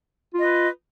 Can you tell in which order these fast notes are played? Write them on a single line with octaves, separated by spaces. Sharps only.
F4 D#5 B4